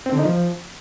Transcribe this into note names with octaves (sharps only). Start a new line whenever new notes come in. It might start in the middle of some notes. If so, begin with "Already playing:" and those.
C4
D3
D#4
F3